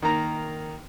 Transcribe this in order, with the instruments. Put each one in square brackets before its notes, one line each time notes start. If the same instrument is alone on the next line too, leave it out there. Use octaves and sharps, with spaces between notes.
[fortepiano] D#3 A#3 A#5